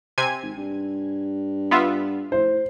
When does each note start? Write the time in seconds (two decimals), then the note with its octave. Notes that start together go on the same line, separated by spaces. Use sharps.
0.18 C3 G#5 G#6
0.43 G#1
0.58 G2
1.71 B3 F4 E5
2.32 A2 C5